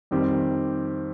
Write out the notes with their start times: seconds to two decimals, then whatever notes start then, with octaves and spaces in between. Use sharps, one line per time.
0.11 F2 D#3 G3 C4 G4